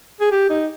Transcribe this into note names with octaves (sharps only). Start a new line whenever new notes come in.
G#4
G4
D#4